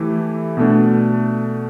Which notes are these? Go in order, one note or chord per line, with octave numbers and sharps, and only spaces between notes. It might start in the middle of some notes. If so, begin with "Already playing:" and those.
Already playing: E3 A3 E4 G4
B2 A3 D4